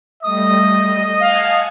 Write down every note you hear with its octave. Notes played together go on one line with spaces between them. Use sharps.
G3 A3 D#5 D#6
F5 F#5 G#5 A5